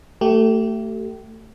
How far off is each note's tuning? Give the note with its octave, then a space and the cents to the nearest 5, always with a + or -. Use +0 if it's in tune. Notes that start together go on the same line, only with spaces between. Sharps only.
A3 +20 G4 -25